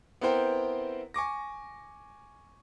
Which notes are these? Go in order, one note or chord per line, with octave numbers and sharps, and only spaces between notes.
B3 C4 E4 A#4 C5 G5
G#5 C#6 D6 A#6